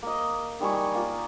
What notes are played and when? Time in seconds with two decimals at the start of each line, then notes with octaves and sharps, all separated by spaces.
0.03 A#3 D#5
0.60 D#3 G3 G#5 C#6
0.95 A#3 F4